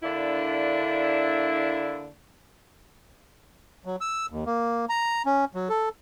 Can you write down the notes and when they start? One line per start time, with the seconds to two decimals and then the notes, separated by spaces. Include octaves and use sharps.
0.03 D3 A#3 D4 E4
3.85 F#3
4.01 E6
4.30 D#2
4.46 A#3
4.89 A#5
5.26 C#4
5.55 F#3
5.69 A4